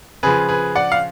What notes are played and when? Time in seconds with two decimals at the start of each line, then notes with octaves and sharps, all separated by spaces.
0.23 C#3 F3 G#4 B4
0.49 G#4 B4
0.75 D5 F#5
0.92 F5